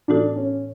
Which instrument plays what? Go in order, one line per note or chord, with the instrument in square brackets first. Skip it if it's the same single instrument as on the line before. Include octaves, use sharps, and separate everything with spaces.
[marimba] A2 E3 B3 F#4 A4 [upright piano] D4
[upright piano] C#4